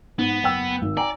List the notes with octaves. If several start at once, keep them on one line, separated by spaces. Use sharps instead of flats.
G#2 B3
F#1 G5 E6
G#1
D5 G5 G#5 A#5